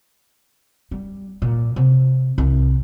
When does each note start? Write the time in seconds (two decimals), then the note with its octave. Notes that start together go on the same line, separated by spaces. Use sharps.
0.91 G3
1.42 A#2
1.76 C3
2.38 C2